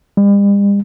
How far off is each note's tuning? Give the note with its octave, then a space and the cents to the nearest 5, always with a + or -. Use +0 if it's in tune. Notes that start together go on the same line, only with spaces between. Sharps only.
G3 +45